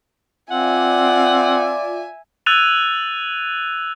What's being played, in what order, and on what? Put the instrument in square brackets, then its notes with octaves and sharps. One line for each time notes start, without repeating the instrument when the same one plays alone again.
[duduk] C4 [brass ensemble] F4 D5 [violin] E5 G#5 [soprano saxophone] F#5
[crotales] E6 F#6 G#6 A6 D#7 F7